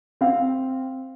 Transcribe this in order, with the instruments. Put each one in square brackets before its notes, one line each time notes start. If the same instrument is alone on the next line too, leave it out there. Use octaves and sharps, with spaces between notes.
[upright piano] C4 F5